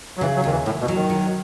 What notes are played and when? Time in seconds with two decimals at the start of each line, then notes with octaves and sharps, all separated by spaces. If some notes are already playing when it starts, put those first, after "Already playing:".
0.17 F#3
0.21 C#3 E3
0.36 F#3
0.44 D#2 D#3
0.51 E3
0.66 D#2 A2
0.81 B2
0.88 F#3
0.96 D#3
1.10 F#3